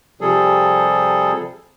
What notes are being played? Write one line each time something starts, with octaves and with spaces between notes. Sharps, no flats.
C3 F3 G3 G#4 A4